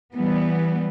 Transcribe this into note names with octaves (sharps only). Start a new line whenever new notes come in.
E3 G3 B3